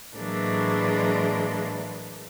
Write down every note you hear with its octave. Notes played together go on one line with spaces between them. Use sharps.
A2 E3 F#3 G#3 A#3 D4